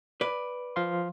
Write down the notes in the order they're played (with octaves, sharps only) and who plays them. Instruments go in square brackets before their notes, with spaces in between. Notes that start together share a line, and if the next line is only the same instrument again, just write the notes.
[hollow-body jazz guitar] B4 D5
[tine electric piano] F3 F5 C6